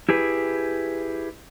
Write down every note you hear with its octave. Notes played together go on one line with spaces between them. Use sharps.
E4 G4 G#4 B4